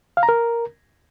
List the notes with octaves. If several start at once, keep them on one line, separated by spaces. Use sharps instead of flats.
F5
A#5
A#4